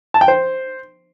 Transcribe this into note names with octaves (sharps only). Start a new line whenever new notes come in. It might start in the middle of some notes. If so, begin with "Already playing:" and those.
A5
G5
C5